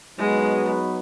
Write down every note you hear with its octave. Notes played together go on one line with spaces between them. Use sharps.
F#3 G#3 B3 D#4 F#4 B4